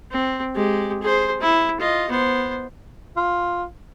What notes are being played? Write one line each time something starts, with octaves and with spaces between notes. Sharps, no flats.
C4
G#3 G4
G#4 C5
E4
F4 D#5
B3 C5
F4